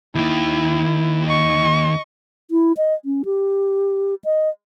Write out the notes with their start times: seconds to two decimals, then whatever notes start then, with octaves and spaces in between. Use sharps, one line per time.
0.15 D#2 D#3 E4
1.27 D#5 C#6
2.51 E4
2.77 D#5
3.05 C#4
3.25 G4
4.25 D#5